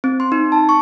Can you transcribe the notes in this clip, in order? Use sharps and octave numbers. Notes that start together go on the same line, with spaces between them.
C4
C6
D#4
A5
C#6